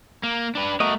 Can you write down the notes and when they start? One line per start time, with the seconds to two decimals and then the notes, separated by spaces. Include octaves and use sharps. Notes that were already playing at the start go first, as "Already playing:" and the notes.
0.23 A#3
0.55 D4 B4
0.80 A3 F#4 A#4 D#5